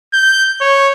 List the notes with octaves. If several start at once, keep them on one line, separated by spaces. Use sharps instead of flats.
G6
C#5